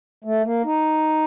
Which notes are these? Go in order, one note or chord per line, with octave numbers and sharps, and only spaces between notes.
A3
A#3
D#4